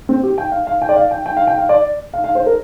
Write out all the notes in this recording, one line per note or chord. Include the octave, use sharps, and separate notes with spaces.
C4
G4
G5
F5
F5
G5
D5
F5
G5
G5
F5
G5
F5
D5
F5
F5
C5
A#4